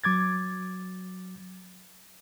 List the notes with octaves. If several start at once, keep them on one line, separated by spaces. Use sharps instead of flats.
F#3 D6 G#6 A6